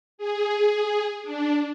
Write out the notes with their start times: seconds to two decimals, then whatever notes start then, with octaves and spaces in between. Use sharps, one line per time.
0.18 G#4
1.23 D4